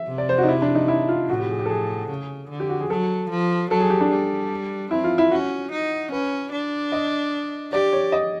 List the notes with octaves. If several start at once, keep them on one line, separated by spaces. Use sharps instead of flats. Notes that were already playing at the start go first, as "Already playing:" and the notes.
Already playing: E5
C3
D5
C5
F#4
D#4
E4
D4
D#4
E4
F4
A2 F#4
G4
G#4
G4
A4
G#4
C#3
D3
G4
F#4
G#4
F#3 A4
F3
F#3 A4
G#4
G4
D4
G3
C4 E4
F4
E4
C#4 F#4
D#4
C#4 B4
D4
D#5
G4 D5
C#5
D#5